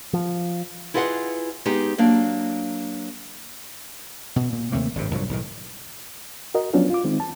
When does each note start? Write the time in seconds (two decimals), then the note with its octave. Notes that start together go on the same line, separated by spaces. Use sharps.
0.13 F3
0.94 E4 F4 G#4 B4 D#5 F#5
1.65 G#3 B3 D#4 G4 G#4
1.98 F#3 A#3 D4
4.36 B2
4.52 A#2
4.72 D#2 C3 A3 A#3
4.95 G#1 G2 C3
5.11 C2 G2 A#2 F#3
5.29 B1 A2 D#3
6.55 F#4 A#4 D#5
6.73 F3 F#3 B3 C#4 D4 F4
6.90 F4 D6
7.04 D#3 G#3 C4 D#4
7.20 A5